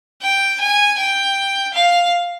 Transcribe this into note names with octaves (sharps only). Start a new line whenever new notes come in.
G5
G#5
G5
F5